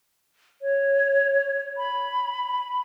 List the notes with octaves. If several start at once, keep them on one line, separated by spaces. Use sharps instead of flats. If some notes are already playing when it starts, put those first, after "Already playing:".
C#5
B5